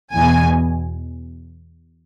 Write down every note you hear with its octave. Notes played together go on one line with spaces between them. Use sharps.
E2 B2 G#5